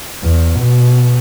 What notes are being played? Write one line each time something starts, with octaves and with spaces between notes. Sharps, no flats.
E2
B2